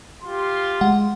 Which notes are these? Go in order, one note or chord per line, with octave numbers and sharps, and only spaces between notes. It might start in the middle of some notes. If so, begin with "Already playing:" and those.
F4 G4 C6
G#3 F#5